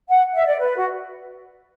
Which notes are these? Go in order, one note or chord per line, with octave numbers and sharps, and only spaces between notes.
F#5
E5
D5
B4
F#4